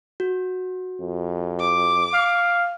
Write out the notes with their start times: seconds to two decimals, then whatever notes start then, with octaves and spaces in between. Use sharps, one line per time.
0.20 F#4
1.01 F2
1.60 D6
2.13 F5